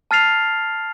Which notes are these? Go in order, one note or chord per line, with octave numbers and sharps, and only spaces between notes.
A5 F6 A6 C7 F7